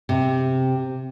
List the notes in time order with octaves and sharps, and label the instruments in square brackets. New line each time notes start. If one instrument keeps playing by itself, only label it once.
[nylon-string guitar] C3